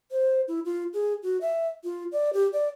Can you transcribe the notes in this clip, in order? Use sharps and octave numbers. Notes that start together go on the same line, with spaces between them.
C5
E4
F4
G#4
F#4
E5
F4
D5
G4
D5